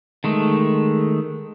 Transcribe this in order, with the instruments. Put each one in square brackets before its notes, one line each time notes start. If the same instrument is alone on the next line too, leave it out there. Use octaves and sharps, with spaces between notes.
[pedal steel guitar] D#3 G#3 A3